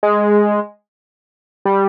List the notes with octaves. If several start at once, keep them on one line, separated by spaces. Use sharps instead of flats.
G#3
G3